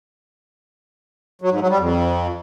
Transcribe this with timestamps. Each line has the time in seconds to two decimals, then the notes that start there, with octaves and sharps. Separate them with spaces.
1.42 F#3
1.51 G#2
1.60 F#3
1.70 G3
1.79 F2